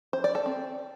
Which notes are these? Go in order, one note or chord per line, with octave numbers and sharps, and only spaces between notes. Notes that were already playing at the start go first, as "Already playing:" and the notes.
C5
D5
A4
C4